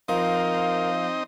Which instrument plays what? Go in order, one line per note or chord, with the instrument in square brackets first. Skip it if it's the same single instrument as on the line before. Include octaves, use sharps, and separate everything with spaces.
[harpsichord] F3 [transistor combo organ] C4 D#4 D#5 [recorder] A#4 [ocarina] F5